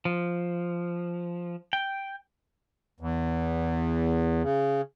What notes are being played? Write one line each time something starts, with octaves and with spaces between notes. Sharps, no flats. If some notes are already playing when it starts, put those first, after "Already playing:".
F3
G5
E2
C#3